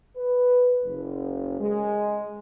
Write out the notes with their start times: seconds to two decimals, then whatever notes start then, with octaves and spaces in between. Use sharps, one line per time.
0.16 B4
0.84 F#1
1.61 G#3